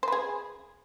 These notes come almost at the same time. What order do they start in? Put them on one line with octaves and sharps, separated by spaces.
C5 B4 G#4